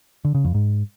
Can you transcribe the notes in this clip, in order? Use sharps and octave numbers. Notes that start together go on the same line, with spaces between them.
D3
C#3
F2
G#2